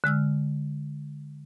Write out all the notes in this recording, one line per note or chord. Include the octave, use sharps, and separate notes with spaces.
D3 G#3 E6 F6